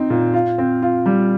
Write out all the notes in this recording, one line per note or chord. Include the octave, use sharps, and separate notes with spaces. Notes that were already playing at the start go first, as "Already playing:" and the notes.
Already playing: C4 D#4
A#2
F4
C4
F4
G3